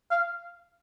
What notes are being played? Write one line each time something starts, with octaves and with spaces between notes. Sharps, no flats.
F5